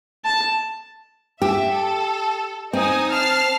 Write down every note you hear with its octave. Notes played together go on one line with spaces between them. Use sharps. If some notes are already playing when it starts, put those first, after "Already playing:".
A5
G4 E5
A4
C4 D#4 G#5 D#6
A5 F6 C7